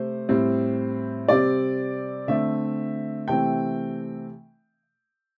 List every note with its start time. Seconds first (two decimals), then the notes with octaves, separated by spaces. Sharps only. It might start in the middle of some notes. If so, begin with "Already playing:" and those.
Already playing: C3 A3 C5
0.29 A2 G3 C4
1.29 C3 G3 C4 D5
2.28 D3 A3 C4 E5
3.28 C3 E3 A3 C4 G5